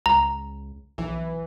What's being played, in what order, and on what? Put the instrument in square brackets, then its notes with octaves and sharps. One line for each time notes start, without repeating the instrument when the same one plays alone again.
[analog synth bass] C#2 [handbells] A#5
[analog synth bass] B1 [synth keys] E3